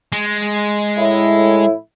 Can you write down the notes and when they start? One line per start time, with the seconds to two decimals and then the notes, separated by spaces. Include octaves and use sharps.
0.12 G#3
0.97 A2 E4